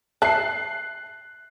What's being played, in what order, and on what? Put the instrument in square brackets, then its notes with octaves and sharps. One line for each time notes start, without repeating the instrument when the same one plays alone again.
[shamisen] E5 A5 [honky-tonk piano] F#6 C7